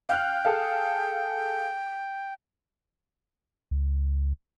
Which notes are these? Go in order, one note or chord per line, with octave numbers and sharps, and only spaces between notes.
F5 G5 F6 F#6
G#4 A4 F5
C#2